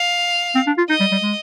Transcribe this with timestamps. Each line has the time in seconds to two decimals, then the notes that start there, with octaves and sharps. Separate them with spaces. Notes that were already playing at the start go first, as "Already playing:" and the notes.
Already playing: F5
0.55 C4
0.67 D4
0.78 F4
0.89 D#4 D#5
1.00 G3
1.12 G3
1.23 G#3